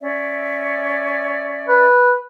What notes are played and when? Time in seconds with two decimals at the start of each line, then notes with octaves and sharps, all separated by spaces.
0.01 C#4 D5 E5
1.68 B4